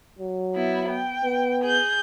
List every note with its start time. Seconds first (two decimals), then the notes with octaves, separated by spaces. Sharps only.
0.19 F#3
0.56 B3 E4
0.90 G5
1.23 B3
1.62 G#4 G6